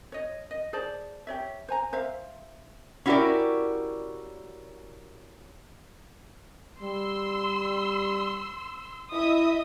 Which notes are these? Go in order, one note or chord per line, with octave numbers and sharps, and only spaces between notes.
C#5 D#5
D#5
G#4 C5 D5 A5
G4 C#5 E5
C5 G#5 A#5
C5 E5 F5
C#4 E4 F#4 G4 A#4 D5
G3 C6 E6
E4 D#5 E5 D#6